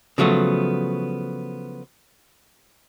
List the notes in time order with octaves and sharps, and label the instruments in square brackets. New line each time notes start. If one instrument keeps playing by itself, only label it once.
[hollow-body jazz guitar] C#3 F3 F#3 A3 B3